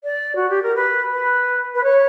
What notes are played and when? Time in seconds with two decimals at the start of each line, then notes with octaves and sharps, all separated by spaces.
0.03 D5
0.35 F#4
0.49 G4
0.62 A#4
0.75 B4
1.11 B4
1.74 B4
1.83 C#5